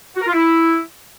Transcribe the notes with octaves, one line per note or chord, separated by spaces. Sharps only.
F#4
A#4
F4
E4